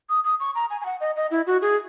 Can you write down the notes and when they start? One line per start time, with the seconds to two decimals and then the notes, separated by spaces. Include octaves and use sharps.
0.09 D#6
0.24 D#6
0.40 C#6
0.55 A#5
0.70 G#5
0.81 G#5
0.86 F#5
1.01 D#5
1.16 D#5
1.31 E4
1.47 F#4
1.62 G#4